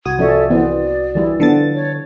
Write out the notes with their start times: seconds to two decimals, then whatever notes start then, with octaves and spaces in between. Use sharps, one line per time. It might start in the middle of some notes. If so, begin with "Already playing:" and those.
0.05 C2 F#4 D#6 G#6
0.19 F3 C#4 A4 C#5 D5 E5
0.50 E3 B3 C4 D5
1.15 E3 G3 E4
1.40 D3 F3 B3 A4 A6
1.74 C#5